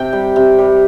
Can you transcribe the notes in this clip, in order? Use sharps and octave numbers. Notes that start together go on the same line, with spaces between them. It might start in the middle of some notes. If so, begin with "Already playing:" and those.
Already playing: C3 G5
G3
C3
G3